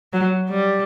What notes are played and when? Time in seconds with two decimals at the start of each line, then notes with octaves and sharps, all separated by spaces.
0.13 F#3
0.50 G3